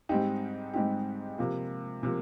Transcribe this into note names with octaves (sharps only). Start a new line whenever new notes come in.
G#2 G3 C4 D#4 G4
G#2 G3 C4 D#4 G4
C3 F3 A#3
C3 F3 A#3